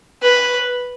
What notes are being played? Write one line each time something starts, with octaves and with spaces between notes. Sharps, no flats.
B4